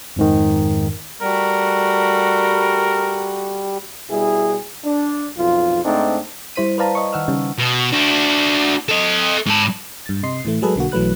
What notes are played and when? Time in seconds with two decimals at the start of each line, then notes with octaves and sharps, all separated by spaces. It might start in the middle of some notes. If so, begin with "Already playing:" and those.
0.16 F2 G#2 D#3
1.21 G3 A3 F#4 A#4
4.10 B2 G3 E4 G#4
4.84 D4
5.37 B1 F2 F4
5.84 G#2 A3 C4 D4 D#4
6.56 G3 E4 C5 B6 D#7
6.78 B4 C5 D5 F5 A5 A#5
6.95 D#5 C#6
7.13 D#3 F#5 E6 F6
7.28 C#3 G3 C#4 D#4
7.59 B2
7.93 D4 F#4
8.88 A4 D#5
9.46 G#2 A5
10.06 G2 A6
10.23 C3 D#5 C6 C7
10.45 A2 E3 A3
10.62 F#3 G#3 G#4 A4 B4
10.76 B1 D3 A#3 F#4
10.92 B1 E3 F#3 A3 B4 F#6